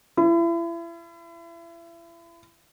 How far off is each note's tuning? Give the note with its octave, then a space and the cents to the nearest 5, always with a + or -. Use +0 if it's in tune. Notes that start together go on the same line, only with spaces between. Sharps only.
E4 +35